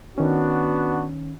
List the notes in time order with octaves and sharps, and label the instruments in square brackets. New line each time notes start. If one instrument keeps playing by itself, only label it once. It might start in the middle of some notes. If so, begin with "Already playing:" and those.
[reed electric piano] D#3 C#4 [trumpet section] B3 D4 F#4